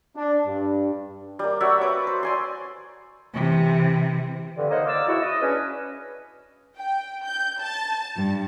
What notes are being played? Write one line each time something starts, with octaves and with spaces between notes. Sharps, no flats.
D4
G2
G3 A#3
F#4 C#5 D5 E5
B4 D6
C5
D5 G#5 C6
C3 E3
G2 D3
A#3 D#4 C5 C#5 D#5 F#5
A#3 D5 E6
G#3 E4 F#4
D#5
C#4 D4 G#4 B4
G5
G6
A5
G2